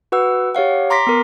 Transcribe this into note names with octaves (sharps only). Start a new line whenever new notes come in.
F#4 B4 F#5 E6
G4 C#5 F5 F#5
A#5 C6 D6 A#6 B6
B3 A#4